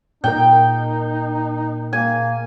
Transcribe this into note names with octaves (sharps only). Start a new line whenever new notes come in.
A#2 D#4 A#4 G5
A#3 G#5